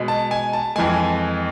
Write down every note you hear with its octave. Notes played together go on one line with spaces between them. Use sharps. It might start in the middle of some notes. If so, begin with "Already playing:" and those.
Already playing: B2 G#3
A5
G#5
A5
F2 E3 G#3 G#5